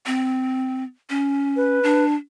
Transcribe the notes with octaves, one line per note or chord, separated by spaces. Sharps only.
C4
C#4
B4
D4